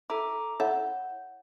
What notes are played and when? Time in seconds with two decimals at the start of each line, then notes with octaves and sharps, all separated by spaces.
0.10 E4 A4 A#5 D6
0.60 E4 A4 C#5 E5 F#5 G6